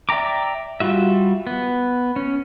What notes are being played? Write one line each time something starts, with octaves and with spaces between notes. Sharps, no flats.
D5 E5 G5 A#5 D6
G3 F4 F#4 E5
B3
C#4